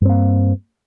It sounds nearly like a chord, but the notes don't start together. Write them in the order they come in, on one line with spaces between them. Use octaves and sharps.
G2 C4 A#3